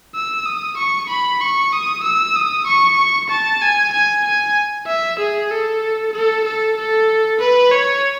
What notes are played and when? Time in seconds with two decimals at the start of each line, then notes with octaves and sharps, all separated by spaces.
0.15 E6
0.46 D#6
0.77 C#6
1.09 B5
1.41 C#6
1.73 D#6
2.04 E6
2.35 D#6
2.67 C#6
3.30 A5
3.61 G#5
3.93 G#5
4.25 G#5
4.87 E5
5.19 G#4
5.50 A4
6.13 A4
6.44 A4
6.77 A4
7.40 B4
7.71 C#5